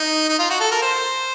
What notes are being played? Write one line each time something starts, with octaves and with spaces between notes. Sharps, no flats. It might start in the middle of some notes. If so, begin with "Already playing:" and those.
Already playing: D#4
D#4
F4
F#4
A4
A#4
C5